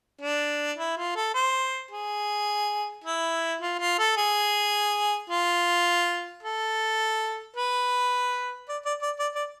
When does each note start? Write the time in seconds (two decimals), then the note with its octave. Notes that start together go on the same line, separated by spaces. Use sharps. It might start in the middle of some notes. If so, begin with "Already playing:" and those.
0.21 D4
0.78 E4
0.97 F4
1.16 A4
1.34 C5
1.91 G#4
3.05 E4
3.61 F4
3.79 F4
3.99 A4
4.17 G#4
5.30 F4
6.43 A4
7.56 B4
8.69 D5
8.85 D5
9.02 D5
9.19 D5
9.35 D5